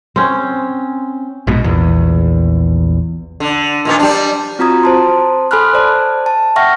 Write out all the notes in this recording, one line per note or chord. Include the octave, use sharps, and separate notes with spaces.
C4 C#4
A#1 G#2 B2
A#1 E2
D3
A#2 D#3 B3
G3 D4
C4 F4 F#4 A#5 D#6 G#6
C5 A5 C6
A4 G#5 B5 C6 F6 F#6
C5 D5 A5
A5
E5 F#5 G5 C#6 F6 A#6